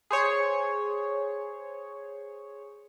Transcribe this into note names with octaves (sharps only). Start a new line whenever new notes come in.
G#4 C5 C#5